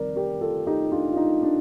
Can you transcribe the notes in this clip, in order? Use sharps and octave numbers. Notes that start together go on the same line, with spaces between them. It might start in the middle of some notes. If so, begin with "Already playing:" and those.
Already playing: F2 C3 D#3 G3 C4 A#4 D5
G4 A#4
F4 A4
D#4 G4
D4 F4
F4
D#4
D4